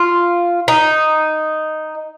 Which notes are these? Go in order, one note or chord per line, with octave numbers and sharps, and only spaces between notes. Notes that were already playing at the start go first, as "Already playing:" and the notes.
Already playing: F4
D#4